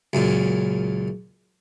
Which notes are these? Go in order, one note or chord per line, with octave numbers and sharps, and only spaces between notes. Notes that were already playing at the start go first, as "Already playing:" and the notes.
C#2 F#2 A#2